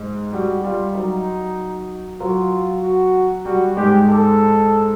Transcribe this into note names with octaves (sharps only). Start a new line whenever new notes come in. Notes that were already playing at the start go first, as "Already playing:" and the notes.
Already playing: G#2 G#3
G3 F#4
G3 F4
F#3 D#4
F#3 F4
F#4
G3 F#4
G#2 G#3 G4
A4